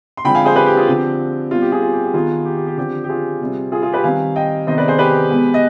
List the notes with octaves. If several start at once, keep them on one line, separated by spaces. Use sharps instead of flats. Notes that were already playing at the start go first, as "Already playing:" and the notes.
C6
D3 F3 G#3 C4 G5 B5
F5 G#5
G#4 C5
G4 B4
G4
F4 G#4
D3 F3 C4 G4
B2 G3 C4 F4
G4
F4 G#4
F4
G4
G4
D#3 B3 F4 G#4
G4
G4
G4
D3 F3 C4 G4
G4
F4 G#4
C3 G3 C4
F4 G#4
F4 G#4
G4 B4
D#3 G3 C4 F5 G#5
D#5 G5
C3 D#3 B3 C5 D#5
B4 D5
G#4 C5
G4 B4
B2 G#3 B3
D#5